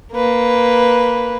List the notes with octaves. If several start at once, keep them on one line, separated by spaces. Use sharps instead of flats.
A#3 B4